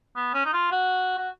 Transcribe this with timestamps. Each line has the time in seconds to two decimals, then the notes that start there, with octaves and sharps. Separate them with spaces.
0.16 B3
0.34 C#4
0.45 D#4
0.53 F4
0.72 F#4
1.18 F#4